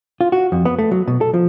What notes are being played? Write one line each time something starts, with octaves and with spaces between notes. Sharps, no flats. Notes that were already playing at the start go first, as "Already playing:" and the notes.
F4
F#4
F2
B3
A3
F#3
B2
A4
F3